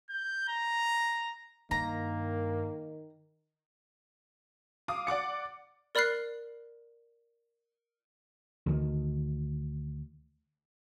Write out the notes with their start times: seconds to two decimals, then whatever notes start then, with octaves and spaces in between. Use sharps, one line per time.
0.10 G6
0.48 A#5
1.71 G2 D#3 A#3 A#5
4.88 F5 D6 D#6
5.07 D5 F#5 D6 C#7
5.95 A#4 D5 B5 F6 F#6 C7
8.66 D2 D#3